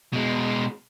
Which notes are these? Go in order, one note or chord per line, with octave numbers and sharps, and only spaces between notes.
B2 G#3